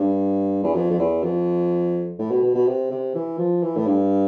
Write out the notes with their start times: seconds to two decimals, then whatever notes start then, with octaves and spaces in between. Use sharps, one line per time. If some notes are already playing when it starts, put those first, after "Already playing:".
Already playing: G2
0.64 E2
0.75 F2
0.90 F2
0.99 E2
1.23 F2
2.19 A2
2.31 B2
2.43 B2
2.55 B2
2.67 C3
2.91 C3
3.15 E3
3.38 F3
3.63 E3
3.76 A2
3.86 G2